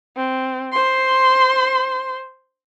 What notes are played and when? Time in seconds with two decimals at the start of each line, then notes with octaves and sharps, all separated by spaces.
0.16 C4
0.72 C5 C6